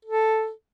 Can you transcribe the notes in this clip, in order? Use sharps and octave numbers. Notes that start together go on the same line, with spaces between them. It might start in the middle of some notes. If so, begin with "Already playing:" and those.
A4